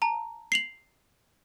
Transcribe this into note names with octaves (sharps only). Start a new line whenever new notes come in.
A5 A#5
C7 F7 F#7